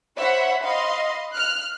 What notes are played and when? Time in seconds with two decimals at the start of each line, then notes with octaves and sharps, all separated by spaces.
0.17 C5 C#5 E5 F#5 B5
0.64 D#5 F5 B5 C6
1.34 F6 F#6